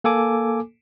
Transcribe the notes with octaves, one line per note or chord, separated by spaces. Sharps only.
A#3 A4 G#5 D6